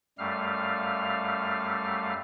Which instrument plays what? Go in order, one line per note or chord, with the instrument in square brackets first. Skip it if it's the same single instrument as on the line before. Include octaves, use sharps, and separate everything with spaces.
[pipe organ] F#2 G3 A3 F5 F6